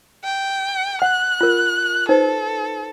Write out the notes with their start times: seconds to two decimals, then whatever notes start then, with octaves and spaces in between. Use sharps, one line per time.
0.25 G5
1.02 F#5 F#6
1.41 F4 A#4
2.09 D#4 A4 B4 C5